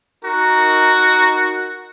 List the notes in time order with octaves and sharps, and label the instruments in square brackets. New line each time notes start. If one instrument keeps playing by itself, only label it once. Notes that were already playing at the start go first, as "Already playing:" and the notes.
[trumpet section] D#4 A#4 C#6 [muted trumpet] F#4